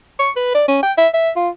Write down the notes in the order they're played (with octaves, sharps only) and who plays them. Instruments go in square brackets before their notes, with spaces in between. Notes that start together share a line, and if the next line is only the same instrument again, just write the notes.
[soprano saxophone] C#6
B4
D5
C#4
G5
E5
E5
F4